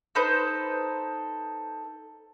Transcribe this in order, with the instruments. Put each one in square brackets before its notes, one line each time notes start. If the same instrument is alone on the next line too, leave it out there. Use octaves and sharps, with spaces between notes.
[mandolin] D#4 A4 B4 C5